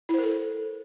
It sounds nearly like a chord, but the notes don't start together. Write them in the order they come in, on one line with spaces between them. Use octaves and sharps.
E4 C5 A#4 A4